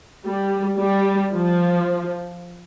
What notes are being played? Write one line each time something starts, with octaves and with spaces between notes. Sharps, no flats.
G3
G3
F3